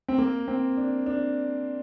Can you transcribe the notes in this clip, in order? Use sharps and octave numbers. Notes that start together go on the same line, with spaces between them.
C4
A#3
C4
D4
D4